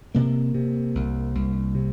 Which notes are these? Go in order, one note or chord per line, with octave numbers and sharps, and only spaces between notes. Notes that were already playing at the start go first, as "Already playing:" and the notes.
C3 A#3
C3
C2
C2
C3